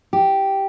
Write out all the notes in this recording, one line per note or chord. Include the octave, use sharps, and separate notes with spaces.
G4